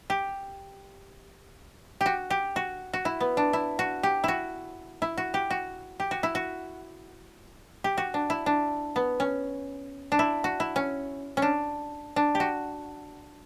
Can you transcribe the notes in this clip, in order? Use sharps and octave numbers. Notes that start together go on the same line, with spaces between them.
G4
G4
F#4
G4
F#4
F#4
E4
B3
D4
E4
F#4
G4
E4 F#4
E4
F#4
G4
F#4
G4
F#4
E4
F#4
G4
F#4
D4
E4
D4
B3
C#4
D4
E4
F#4
E4
C#4
C#4
D4
D4
G4
F#4